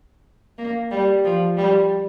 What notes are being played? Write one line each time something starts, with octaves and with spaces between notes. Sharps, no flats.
A#3
G3
F3
G3